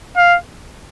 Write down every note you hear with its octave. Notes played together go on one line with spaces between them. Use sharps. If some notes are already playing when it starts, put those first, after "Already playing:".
F5